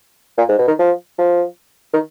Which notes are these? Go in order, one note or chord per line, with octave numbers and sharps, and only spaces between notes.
A#2
G#2
B2
D#3
F3
F3
D#3